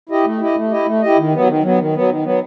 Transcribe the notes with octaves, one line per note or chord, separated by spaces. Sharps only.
E4 G4 D#5
A3
E4 G4 D#5
A3
E4 G4 D#5
A3
E4 G4 D#5
D#3
F#3 B3
D#3
F#3 B3
D#3
F#3 B3
D#3
F#3 B3